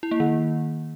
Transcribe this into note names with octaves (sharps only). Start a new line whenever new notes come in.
E4
A#3
D#3